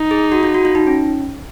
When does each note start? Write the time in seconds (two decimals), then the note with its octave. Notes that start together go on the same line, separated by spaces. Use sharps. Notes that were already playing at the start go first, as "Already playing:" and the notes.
Already playing: D#4
0.11 G#4
0.32 F#4
0.43 F4
0.54 F#4
0.65 F4
0.75 D#4
0.87 C#4